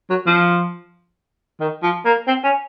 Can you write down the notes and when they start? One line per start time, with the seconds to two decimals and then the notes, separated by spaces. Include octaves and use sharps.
0.10 F#3
0.26 F3
1.60 D#3
1.83 F3
2.05 A#3
2.27 C4
2.44 C#4